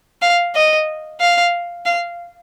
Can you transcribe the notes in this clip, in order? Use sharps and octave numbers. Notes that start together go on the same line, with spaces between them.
F5
D#5
F5
F5